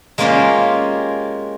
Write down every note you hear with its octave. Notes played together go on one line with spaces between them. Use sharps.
G#3 A#3 C#4 F4 G4 C5